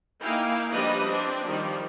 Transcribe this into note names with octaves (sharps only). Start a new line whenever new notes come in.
A#3 D#4 E4 F5 G5 G#5
F3 G3 D4 B4 D#5
C4 D4
D#3 F3 G3